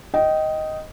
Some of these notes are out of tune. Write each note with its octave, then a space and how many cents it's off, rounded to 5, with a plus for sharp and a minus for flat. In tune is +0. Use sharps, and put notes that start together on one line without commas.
D#5 +5 G5 -20